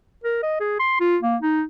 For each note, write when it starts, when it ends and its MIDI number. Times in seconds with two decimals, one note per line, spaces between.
0.24 0.39 70
0.43 0.60 75
0.60 0.75 68
0.80 0.98 84
1.00 1.17 65
1.23 1.37 58
1.42 1.64 63